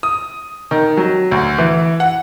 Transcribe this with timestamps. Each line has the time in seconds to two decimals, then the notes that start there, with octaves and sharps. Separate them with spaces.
0.03 D#6
0.71 D#3
0.97 F#3
1.32 D2
1.58 E3
2.00 F#5